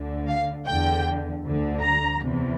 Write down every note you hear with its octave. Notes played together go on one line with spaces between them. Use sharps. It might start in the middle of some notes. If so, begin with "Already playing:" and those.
Already playing: D2 D3
F5
E2 D3 G5
D2 D3
A#5
E2 C3 E3